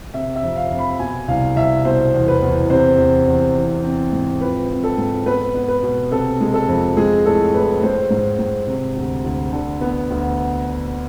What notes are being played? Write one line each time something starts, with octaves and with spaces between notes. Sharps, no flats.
C3 E5
E5
F2
F5
F2
B5
B2 G#5
C2 F5
C2 E5
B2 C5
E2
B4
E2
C3 C5
E2
E2
E3
C4
G#2
F3 B4
C4
A4
G#2
B3 B4
B3
B4
B2
C3 A4
G#3
A4
F2
G#3 G#4
A2 A4
A2 B4
G#3 C5
G#2
G#2
C3
D2
D2
D3
B3
D2